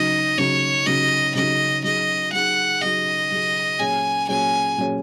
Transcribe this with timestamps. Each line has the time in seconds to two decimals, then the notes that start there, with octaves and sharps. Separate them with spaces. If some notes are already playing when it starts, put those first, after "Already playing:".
Already playing: C#3 F#3 D#4 D#5
0.38 C#3 F#3 D#4 C#5
0.86 C#3 F#3 D#4 D#5
1.35 C#3 F#3 D#4 D#5
1.83 F#3 D#4 G#4 D#5
2.33 F#3 D#4 G#4 F#5
2.81 F#3 D#4 G#4 D#5
3.31 F#3 D#4 G#4
3.79 A#2 F#3 C#4 G#4 C#5 G#5
4.29 A#2 F#3 C#4 G#4 C#5 G#5
4.77 A#2 F#3 C#4 G#4 C#5